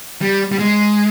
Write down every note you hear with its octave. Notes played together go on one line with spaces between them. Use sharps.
G3
G3
G#3